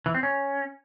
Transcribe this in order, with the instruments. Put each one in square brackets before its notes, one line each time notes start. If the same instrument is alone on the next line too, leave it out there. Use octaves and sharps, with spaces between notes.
[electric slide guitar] E3
C4
C#4